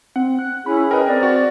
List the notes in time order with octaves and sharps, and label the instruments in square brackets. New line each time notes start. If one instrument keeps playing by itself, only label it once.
[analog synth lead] C4 [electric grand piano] F#5
[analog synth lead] F#6
[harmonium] C#4 G#4 [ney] E4 [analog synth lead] B5
[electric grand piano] A#4 D#5 [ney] B4 [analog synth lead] G5
[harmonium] C4 [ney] D5
[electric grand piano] F#4 [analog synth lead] A6